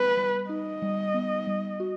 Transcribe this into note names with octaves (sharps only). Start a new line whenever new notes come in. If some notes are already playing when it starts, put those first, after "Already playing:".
Already playing: G3 B3 B4
G3
D#4 D#5
G3
B3
G3
F#4